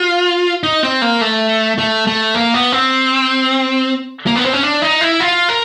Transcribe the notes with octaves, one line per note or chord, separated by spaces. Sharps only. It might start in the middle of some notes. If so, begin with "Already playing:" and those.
Already playing: F4
D#4
C4
A#3
A3
A3
A3
A#3
B3
C4
A#3
B3
C4
C#4
D4
D#4
E4
F4
A#4